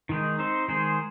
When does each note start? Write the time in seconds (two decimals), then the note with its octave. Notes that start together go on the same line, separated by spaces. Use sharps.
0.09 D#3 G#3 D#4
0.39 C4 D#4 C5
0.68 D#3 G#3 D#4 G#4 C5